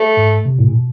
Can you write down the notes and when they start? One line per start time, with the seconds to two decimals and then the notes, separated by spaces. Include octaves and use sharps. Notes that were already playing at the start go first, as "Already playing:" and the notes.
Already playing: A3
0.17 G#2
0.45 C3
0.59 A2
0.67 A#2
0.75 B2